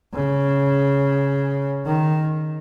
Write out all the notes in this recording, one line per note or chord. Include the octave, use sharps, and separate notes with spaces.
C#3
D#3